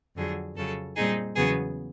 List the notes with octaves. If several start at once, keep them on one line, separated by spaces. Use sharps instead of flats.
F2 D3 F#3 G#4
F2 C#3 F#3 A4
A#2 G3 C4 D#4 G#4
E2 C#3 F#3 B3 G#4